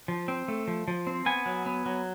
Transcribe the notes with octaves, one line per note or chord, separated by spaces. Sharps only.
F3
C4
A3
F3
F3
C4
B3 G#5
F#3
B3
F#3